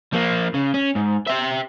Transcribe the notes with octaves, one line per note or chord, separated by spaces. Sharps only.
F3 A#3
C#3
C#4
G#2
G4 E5